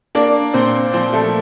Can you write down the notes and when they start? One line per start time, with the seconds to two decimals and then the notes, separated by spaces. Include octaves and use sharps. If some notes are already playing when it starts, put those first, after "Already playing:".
0.15 A#3 D4 D5
0.54 A#2 C4 C5
0.93 F3 C4 C5
1.13 A3 A4